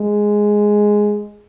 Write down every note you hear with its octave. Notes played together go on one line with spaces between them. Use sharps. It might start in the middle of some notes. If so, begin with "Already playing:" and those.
Already playing: G#3